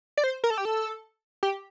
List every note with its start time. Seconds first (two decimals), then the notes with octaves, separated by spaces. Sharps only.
0.17 D5
0.24 C5
0.44 A#4
0.50 A4
0.58 G4
0.65 A4
1.43 G4